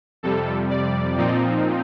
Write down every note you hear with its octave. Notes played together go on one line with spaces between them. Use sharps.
F2 C3 G3 A4
D5
A#2 F3 C4 D#4